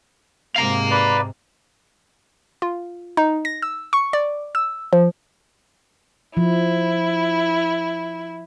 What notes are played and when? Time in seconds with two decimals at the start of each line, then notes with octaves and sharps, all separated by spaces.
0.56 G#2 C3 F5 A#5
0.91 B4 D5
2.62 F4
3.17 D#4
3.45 A#6
3.62 E6
3.93 C#6
4.13 D5
4.55 E6
4.93 F3
6.37 F3 E4